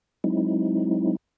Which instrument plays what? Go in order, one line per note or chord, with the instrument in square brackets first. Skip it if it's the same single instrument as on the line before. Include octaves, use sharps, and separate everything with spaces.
[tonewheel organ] F#3 G#3 C4 D#4 E4